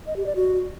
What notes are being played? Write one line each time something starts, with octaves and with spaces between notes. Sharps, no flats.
D#5
G4
D5
F#4